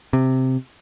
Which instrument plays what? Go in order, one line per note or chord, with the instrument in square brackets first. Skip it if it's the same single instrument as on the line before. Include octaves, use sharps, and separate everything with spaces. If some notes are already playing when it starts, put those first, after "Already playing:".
[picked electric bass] C3